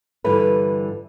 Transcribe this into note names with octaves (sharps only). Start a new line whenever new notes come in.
G2 D3 E3 B4